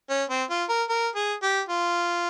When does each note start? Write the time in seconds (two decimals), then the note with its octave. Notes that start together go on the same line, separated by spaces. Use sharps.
0.10 C#4
0.30 C4
0.50 F4
0.69 A#4
0.89 A#4
1.15 G#4
1.43 G4
1.69 F4